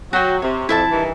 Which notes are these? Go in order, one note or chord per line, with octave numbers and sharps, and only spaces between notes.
F#3 F#4 G5
C3 C#5
F2 E4 E5 A5
G2 D#3 E3